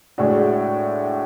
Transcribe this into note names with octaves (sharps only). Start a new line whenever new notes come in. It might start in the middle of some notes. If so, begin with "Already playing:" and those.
A2 G#3 D4 F#4